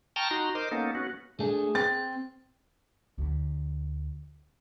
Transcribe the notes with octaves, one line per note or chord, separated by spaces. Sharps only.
G5 A5 A#5 C#6 D#6 F6
D#4 F#4 A#5 C6
A#4 C5 D#5 C6 D6
A#3 B3 C#4 D#4 A4
B3 C#4 F#4
A3 D4 G#4
C4 A6
D2